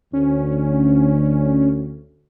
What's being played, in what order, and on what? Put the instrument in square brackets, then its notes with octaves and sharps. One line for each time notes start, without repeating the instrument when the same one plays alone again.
[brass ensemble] D2 [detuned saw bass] C#4